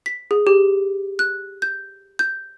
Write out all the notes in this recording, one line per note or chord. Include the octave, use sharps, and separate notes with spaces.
B6
G#4
G4
F#6
G6
G6